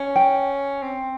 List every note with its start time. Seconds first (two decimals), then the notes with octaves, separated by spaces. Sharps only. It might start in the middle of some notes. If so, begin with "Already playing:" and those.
Already playing: C#4
0.16 G5
0.83 C4